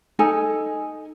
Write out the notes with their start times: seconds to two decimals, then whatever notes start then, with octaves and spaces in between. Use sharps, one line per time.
0.19 D#4 A4 G#5